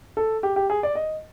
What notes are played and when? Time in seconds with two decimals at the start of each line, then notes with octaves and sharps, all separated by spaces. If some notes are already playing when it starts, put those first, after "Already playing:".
0.17 A4
0.43 G4
0.56 G4
0.70 G#4
0.83 D5
0.95 D#5